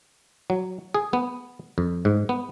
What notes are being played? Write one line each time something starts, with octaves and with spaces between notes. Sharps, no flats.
F#3
G#4
B3
F2
G#2
B3